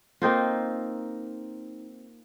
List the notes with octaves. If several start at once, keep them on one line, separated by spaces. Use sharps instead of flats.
A#3 C4 D#4 F4